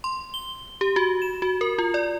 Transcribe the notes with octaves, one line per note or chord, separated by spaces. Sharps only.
C6
G7
G4
F#4
E7
F#4
A#4
F4
D5